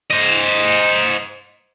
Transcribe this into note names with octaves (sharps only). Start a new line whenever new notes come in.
C5 D#5